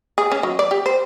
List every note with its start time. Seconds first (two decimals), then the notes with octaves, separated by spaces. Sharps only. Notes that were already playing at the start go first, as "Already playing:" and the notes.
0.18 G#4
0.32 C#4
0.43 F#3
0.59 D5
0.71 G4
0.86 C5